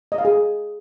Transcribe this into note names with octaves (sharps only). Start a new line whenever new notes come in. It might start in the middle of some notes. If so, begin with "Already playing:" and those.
D#5
F5
G#4